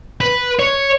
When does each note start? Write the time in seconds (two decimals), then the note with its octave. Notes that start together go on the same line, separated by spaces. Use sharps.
0.21 B4
0.59 C#5